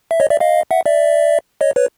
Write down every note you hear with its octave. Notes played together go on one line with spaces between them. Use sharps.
E5
C#5 D#5
D5 E5
D#5 F5
E5 F#5
D5 E5
C#5 D#5
B4 C#5